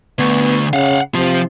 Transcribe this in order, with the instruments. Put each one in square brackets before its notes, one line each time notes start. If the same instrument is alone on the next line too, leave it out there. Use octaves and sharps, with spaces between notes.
[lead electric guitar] D3 A3 [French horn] B3
[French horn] C#3 [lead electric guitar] F5 F#5
[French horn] C3 [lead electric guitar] F3 F4